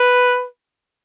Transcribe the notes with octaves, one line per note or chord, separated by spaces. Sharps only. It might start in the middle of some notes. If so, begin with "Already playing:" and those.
Already playing: B4